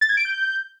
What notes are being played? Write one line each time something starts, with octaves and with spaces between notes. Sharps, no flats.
A6
G#6
D7
G6